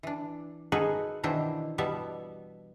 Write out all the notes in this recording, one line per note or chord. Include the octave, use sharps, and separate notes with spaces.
E3 D4
A#3 D#4 F#4 G#4 A4 B4
B2 D#3 E3 D4 E4 C5
B2 G3 B3 E5 A5